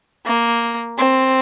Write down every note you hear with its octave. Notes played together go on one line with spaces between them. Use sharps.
A#3
C4